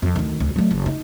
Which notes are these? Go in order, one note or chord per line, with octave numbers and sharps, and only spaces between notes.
F2 E3
D2 D#3
D2
F#3 A3
F#1
D#4